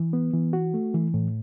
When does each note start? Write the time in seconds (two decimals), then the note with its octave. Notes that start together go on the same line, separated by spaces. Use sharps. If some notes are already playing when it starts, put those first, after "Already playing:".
Already playing: E3
0.13 B3
0.34 E3
0.53 F#4
0.74 A3
0.94 E3
1.14 A2